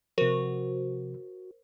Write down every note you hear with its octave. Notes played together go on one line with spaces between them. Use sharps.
C3 F3 F#4 A#4 C5